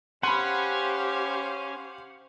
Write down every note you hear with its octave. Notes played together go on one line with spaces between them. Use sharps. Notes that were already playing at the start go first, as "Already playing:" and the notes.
C#4 G4 C5 F5 F#5 B5 C6